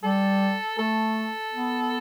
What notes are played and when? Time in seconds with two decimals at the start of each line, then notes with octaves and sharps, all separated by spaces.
0.03 G3 A4
0.78 A3 A4
1.53 B3